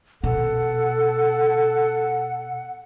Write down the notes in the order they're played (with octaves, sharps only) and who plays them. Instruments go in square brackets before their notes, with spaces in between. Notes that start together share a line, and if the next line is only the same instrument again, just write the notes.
[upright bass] B2 [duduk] A4 [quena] F#5